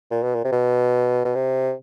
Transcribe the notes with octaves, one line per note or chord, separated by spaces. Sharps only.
A#2
B2
A#2
C3
B2
B2
C3